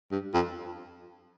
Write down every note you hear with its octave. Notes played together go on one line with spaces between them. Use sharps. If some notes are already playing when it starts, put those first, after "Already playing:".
G2
F2